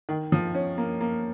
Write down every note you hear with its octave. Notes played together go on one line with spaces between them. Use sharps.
D#3
F3
C#4
A#3
A#3